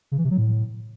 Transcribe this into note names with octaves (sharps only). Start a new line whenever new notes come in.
C#3
E3
C3
F#3
A2